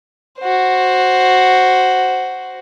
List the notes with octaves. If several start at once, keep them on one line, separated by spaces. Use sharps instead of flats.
F#4 C5